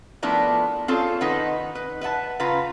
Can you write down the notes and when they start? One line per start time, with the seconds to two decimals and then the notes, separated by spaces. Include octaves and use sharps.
0.22 F3 A3 B3 D4 E4 A#4
0.88 C4 F4 G#4 A4 C5 C#5
1.21 D#3 D#4 B4 F#5
1.75 B4
2.01 B4 E5 F#5 A5
2.40 C#3 F4 B4 A#5